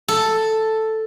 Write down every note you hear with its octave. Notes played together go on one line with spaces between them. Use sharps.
A4